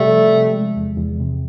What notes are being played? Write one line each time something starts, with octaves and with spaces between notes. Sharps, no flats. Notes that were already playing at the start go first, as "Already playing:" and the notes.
Already playing: C3 G3 A3
F3
C3
G#3
E2
E2
C3